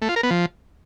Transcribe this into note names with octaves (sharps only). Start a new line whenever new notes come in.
A3
F4
A#4
B3
F3